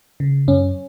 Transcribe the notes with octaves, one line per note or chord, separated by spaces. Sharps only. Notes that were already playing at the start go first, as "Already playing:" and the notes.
C#3
F#2 C#4